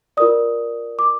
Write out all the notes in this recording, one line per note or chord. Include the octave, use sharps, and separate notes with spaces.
F4 A#4 D5 D#6
D6